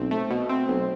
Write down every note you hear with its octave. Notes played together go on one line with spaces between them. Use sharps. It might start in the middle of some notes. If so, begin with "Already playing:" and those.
Already playing: B1 C4
A3
B2
C4
B1